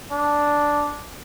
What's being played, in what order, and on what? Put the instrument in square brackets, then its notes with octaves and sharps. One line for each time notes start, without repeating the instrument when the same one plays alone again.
[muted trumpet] D4